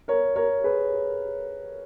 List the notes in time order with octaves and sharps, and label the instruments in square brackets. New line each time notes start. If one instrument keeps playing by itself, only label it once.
[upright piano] A#4 C#5
A#4 C#5
G#4 B4